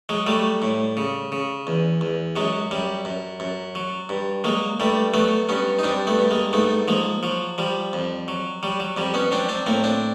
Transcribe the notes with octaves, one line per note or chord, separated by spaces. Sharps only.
F#3 G#3
F#3 G3 A3
A2
C#3
C#3
E2
E2
F#2 F#3 G#3
F#2 G3
F#2
F#2
F#3
G2
F#3 G#3 A#3
G2 G3 A3
F#3 A3 B3
G2 B3 C#4
D#4
G2 C4 D4
A3 B3
G2
G#3 A#3
G#2 A3 B3
F3 G#3 A#3
F3 F#3
F3 G3
F2
F#3
F#3 G3
F#3
F2 G3
B3 C#4
F#3 C4 D4
C4 D4
A2 A#3 C4
C4 D4